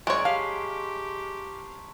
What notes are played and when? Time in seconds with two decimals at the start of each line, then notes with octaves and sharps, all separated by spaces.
0.07 F#2 G#3 C#5 D5 A#5 C#6 D7
0.25 G4 F5 A5 C6 B6